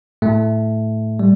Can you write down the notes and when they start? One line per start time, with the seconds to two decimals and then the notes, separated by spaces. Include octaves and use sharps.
0.22 A2 A3
1.19 G3